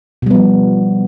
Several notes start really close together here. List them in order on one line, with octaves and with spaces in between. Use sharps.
B2 G3 B3 F3